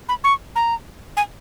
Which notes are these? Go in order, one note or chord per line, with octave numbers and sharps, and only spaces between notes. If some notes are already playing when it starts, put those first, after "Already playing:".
B5
C#6
A#5
G#5